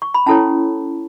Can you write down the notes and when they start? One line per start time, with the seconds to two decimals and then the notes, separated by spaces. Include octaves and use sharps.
0.02 C#6
0.14 B5
0.26 C#4 E4 A4 C#5 A5